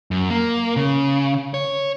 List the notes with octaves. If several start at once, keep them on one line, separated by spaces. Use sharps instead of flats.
F#2
A#3
C#3
C#5